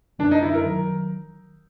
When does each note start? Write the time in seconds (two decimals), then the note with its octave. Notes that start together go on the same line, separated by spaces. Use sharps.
0.19 F#2 D3 G3 D4
0.31 D#4
0.43 E4
0.54 A#4
0.66 D#3 F#3